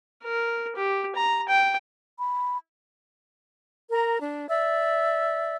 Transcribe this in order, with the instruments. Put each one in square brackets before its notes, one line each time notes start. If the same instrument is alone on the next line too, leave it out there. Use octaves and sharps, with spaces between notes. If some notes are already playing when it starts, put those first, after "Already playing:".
[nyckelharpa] A#4
G4
A#5
G5
[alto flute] B5
[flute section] A#4 A#5
D4
D5 E5 E6